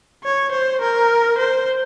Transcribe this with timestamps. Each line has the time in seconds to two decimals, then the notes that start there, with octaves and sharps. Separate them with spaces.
0.23 C#5
0.51 C5
0.81 A#4
1.38 C5